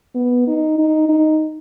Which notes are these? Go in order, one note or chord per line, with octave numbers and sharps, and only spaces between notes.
B3
D#4
D#4
D#4